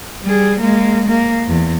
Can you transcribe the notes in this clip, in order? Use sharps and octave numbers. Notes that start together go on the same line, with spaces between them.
G3 G#4
G#3 A#3
A#3
E2